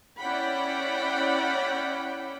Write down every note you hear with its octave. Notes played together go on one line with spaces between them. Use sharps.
C#4 E4 D5 F#5 G5 B5